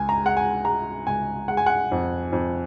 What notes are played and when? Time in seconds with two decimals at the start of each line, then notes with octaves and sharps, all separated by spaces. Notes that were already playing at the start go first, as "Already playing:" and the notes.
Already playing: C#2 G#5
0.09 A#5
0.22 G#3 F#5
0.37 G#5
0.65 G#3 A#5
1.07 C#2 G#5
1.48 G#3 F#5
1.57 G#5
1.66 F#5
1.92 F2
2.33 F2